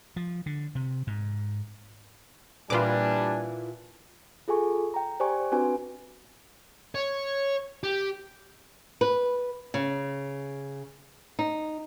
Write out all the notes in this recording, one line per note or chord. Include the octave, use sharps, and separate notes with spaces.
F3
D3
C3
G#2
A#2 E3 G3 D4 F4 B4 G#5 D6
F4 G#4 A4 G#5 C#6
G5 A#5
G4 C5 D5 G5 G#5 C#6
C4 D4 F#4 B4 G#5
C#5
G4
B4
C#3
D#4